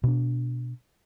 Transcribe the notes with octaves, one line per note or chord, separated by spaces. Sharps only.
B2 D4